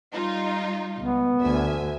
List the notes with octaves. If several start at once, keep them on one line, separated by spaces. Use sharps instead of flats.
G3 D#4 F4
C#2 B3
D2 E5 G#5